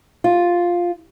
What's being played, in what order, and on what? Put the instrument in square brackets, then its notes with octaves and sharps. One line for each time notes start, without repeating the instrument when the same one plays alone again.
[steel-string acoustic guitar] F4